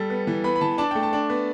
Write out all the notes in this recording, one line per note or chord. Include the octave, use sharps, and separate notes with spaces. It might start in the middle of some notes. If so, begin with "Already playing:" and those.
Already playing: G3 A4
B3
E3
B3 B5
B5
E3 A5
D4 A5
A3 G5
A5
D4
B3